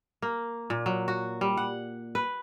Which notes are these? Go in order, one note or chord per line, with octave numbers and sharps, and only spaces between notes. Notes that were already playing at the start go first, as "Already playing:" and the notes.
A#3
A#2
F#3
F#4
G3
F#5
B4